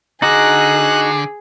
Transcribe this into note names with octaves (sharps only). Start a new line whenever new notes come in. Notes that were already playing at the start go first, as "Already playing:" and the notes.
D3 D#4 F#4 G#4 D#5 F#6